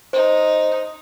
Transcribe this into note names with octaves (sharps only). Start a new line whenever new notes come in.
D#4 C5